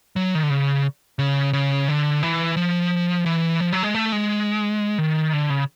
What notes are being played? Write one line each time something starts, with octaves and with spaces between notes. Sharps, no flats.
F#3
D#3
D3
C#3
C#3
C#3
D3
E3
F3
E3
F3
F#3
G#3
A3
G#3
D#3
D3
C#3